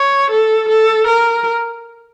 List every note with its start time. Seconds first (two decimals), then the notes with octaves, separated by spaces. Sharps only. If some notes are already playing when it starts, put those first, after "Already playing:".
Already playing: C#5
0.31 A4
0.69 A4
1.07 A#4